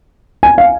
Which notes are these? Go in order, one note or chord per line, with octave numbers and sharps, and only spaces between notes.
G#5
F5